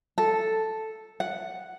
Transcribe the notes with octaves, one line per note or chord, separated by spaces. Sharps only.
A4
F#5